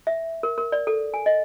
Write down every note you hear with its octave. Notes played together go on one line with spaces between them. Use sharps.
E5
A#4
A#4
D5
A4
G#5
D#5